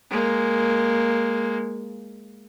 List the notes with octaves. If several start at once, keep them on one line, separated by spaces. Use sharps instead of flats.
G#3 A#3